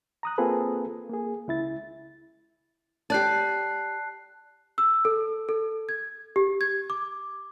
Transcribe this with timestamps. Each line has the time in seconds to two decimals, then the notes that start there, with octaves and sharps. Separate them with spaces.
0.23 A#5 D#6 F#6
0.38 A#3 C4 F4 G#4 A4 B4
1.09 A#3 G#4
1.48 C#2 E4 A6
3.10 G4 D5 A5 F#6 C7
4.78 E6
5.05 A4
5.49 A4
5.89 G#6
6.36 G4
6.61 G#6
6.90 D6